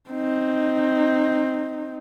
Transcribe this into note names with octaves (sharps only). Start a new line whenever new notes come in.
C4 D#4